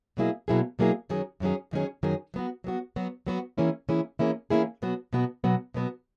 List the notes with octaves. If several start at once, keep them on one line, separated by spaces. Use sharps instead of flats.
B2 F#3 A#3 E4 G#4
B2 F#3 A#3 E4 G#4
B2 F#3 A#3 E4 G#4
F#2 D#3 F#3 C#4 G#4
F#2 D#3 F#3 C#4 G#4
F#2 D#3 F#3 C#4 G#4
F#2 D#3 F#3 C#4 G#4
F#3 B3 F#4
F#3 B3 F#4
F#3 B3 F#4
F#3 B3 F#4
E3 A#3 C#4 E4 G#4
E3 A#3 C#4 E4 G#4
E3 A#3 C#4 E4 G#4
E3 A#3 C#4 E4 G#4
B2 F#3 B3 F#4
B2 F#3 B3 F#4
B2 F#3 B3 F#4
B2 F#3 B3 F#4